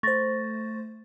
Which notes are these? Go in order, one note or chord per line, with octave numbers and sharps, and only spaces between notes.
A3 C5 C#6 A6 A#6